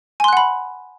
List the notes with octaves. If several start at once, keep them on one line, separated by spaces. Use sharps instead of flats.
F#5 G#5 B5 C6 F#6